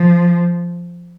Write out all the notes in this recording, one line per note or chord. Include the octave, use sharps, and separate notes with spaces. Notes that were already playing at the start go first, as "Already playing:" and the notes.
Already playing: F3